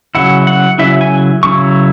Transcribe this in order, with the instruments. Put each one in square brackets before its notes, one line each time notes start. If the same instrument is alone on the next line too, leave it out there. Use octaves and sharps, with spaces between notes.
[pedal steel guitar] C#3 F#3 E4 F#5
F#5
C#3 F#3 E4 E5
G#5
C#3 F#3 E4 C#6